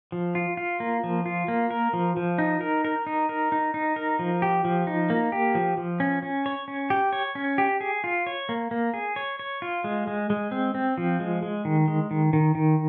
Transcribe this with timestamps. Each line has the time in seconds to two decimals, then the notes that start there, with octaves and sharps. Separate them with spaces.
0.12 F3
0.35 F4
0.57 F4
0.80 A#3
1.04 F3
1.26 F4
1.48 A#3
1.71 A#4
1.93 F3
2.17 F3
2.38 D#4
2.61 A#4
2.85 A#4
3.07 D#4
3.29 A#4
3.52 D#4
3.74 D#4
3.96 A#4
4.19 F3
4.42 G4
4.65 F3
4.87 D#4
5.10 A#3
5.32 G4
5.55 F3
5.78 F3
6.00 C#4
6.23 C#4
6.46 C#5
6.68 C#4
6.90 G4
7.13 C#5
7.35 C#4
7.58 G4
7.81 G#4
8.04 F4
8.27 C#5
8.49 A#3
8.71 A#3
8.94 G#4
9.16 C#5
9.39 C#5
9.62 F4
9.84 G#3
10.07 G#3
10.30 G#3
10.51 C4
10.75 C4
10.98 F3
11.20 G#3
11.43 G#3
11.65 D#3
11.88 G#3
12.11 D#3
12.33 D#3
12.55 D#3